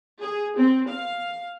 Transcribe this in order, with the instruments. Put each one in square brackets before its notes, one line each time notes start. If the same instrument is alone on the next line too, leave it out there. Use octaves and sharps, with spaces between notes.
[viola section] G#4
C4
F5